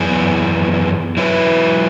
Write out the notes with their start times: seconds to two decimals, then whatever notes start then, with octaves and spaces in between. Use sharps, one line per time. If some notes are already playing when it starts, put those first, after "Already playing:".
Already playing: F#2 E3 B3 G#4
1.17 F#3 E4 B4